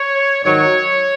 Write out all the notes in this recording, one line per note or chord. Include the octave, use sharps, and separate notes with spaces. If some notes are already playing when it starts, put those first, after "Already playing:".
Already playing: C#5
G#2 D#3 F#3 C#5